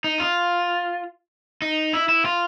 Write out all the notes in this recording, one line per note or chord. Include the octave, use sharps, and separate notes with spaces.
D#4
F4
D#4
E4
E4
F4